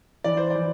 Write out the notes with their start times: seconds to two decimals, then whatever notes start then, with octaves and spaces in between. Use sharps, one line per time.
0.24 E3 D5
0.37 C5
0.50 E3 D5